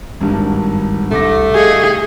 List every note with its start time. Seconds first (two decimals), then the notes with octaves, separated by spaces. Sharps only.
0.21 G#1 G2
1.11 C2 A3 D6 A#6
1.55 G4 G#4 D#5 F5